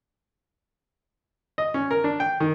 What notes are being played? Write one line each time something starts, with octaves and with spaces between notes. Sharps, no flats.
D#5
C#4
A#4
D4
G5
D#3